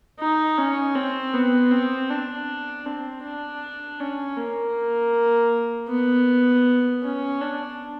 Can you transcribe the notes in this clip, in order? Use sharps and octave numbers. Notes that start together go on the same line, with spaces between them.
D#4
C#4
C4
B3
C4
D4
C4
D4
C#4
A#3
B3
C#4
D4